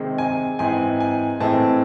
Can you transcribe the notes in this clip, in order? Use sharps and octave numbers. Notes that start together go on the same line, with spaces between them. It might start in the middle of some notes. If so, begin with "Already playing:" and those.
Already playing: C3 D#3 G#3 C4
G#5
G#2 E3 C4 G#5
G#5
A2 E3 G#3 C4 A5